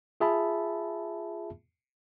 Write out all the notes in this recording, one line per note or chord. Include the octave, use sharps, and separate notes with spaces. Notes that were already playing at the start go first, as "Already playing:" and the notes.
F4 G#4 E5 A5 B5